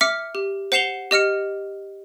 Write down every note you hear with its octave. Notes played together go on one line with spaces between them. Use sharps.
E5 D6 F6 B6 C#7
G4
C5 F#5 C7 E7 F7 G7
G4 D#5 F6 C#7